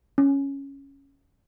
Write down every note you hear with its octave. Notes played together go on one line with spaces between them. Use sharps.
C#4